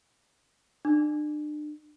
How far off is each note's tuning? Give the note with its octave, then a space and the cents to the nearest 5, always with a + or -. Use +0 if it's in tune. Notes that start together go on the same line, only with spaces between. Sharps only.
D4 +35